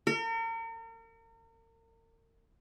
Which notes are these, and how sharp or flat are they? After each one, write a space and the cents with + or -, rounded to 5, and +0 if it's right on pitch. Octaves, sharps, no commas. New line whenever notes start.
A#4 -40